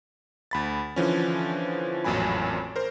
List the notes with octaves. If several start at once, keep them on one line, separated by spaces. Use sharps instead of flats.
D2 B5 A6
D3 E3 F3 C#4
A1 F2 A#2 F#3 G#5 B5
A#4 C5